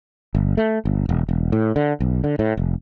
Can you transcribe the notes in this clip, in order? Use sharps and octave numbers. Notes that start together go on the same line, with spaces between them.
G1
A3
G1
E1
E1
A2
D3
B1
D3
A2
F1